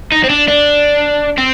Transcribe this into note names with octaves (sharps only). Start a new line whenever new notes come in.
D#4
C4
D4
D4
C4